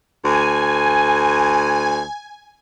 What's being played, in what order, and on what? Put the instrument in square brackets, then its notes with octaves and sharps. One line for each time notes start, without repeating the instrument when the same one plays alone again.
[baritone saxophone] D2 [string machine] G#5